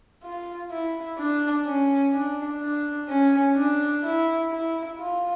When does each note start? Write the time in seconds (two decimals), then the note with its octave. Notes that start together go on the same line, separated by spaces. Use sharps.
0.23 F4
0.71 E4
1.18 D4
1.66 C#4
2.13 D4
2.61 D4
3.08 C#4
3.56 D4
4.04 E4
4.52 E4
4.99 F4